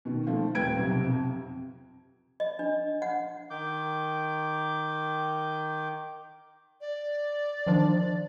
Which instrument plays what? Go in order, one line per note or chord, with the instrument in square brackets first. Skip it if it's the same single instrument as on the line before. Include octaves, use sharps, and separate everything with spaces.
[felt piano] B2 D#3
D#3 F3 A3
D#1 C4 B4 G5 G#6 D7
B1 C3
F2 C3
[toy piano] D#5
D4
F#5
[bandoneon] D#3 D6 G6
[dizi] D5
[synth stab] D#3 F3 D4